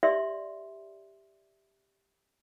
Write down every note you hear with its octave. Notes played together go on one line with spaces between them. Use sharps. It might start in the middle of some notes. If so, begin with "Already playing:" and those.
G4 D5 E5 C6